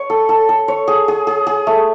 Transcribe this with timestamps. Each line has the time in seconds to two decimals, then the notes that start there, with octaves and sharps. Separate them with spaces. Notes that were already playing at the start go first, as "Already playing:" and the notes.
Already playing: C#5
0.10 A4
0.29 A4
0.49 A4
0.68 C#5
0.88 G#4
1.08 G#4
1.27 G#4
1.47 G#4
1.67 A3